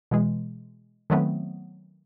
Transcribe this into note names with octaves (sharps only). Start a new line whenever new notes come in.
B2 E3 G#3
D#3 F#3 A3 B3 C4